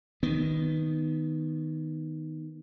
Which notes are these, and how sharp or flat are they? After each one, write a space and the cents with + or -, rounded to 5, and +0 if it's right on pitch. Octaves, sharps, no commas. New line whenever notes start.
D#3 +0 B3 +0